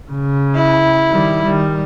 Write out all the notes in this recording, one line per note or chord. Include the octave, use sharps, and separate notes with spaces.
C#3
E4
D#3 G3
D#3 G3